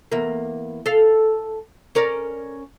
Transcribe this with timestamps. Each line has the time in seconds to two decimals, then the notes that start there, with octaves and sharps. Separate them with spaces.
0.12 E2 A#3
0.86 A4 F5
1.95 C#4 A#4 D5